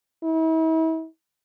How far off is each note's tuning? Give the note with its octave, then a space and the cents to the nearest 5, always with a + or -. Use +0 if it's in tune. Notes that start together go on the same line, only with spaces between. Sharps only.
E4 -40